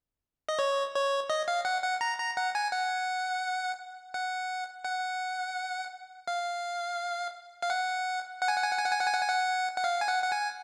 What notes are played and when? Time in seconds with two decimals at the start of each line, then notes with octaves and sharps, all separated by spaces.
0.49 D#5
0.59 C#5
0.95 C#5
1.30 D#5
1.48 F5
1.65 F#5
1.83 F#5
2.01 A#5
2.19 A#5
2.37 F#5
2.55 G#5
2.72 F#5
4.14 F#5
4.85 F#5
6.28 F5
7.62 F5
7.70 F#5
8.42 F#5
8.48 G#5
8.56 F#5
8.64 G#5
8.71 F#5
8.78 G#5
8.85 F#5
8.92 G#5
9.00 F#5
9.07 G#5
9.14 F#5
9.21 G#5
9.29 F#5
9.78 F#5
9.84 F5
10.01 G#5
10.08 F#5
10.23 F#5
10.32 G#5